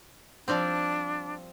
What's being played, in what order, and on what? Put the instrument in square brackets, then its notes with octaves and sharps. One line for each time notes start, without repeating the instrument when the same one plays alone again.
[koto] F3 G3 C4 [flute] D4